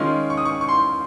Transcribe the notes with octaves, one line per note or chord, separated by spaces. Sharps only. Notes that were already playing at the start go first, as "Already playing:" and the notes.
Already playing: D#3 G#3 C#4 F4 C6
C#6
D#6
C#6
C#6
C6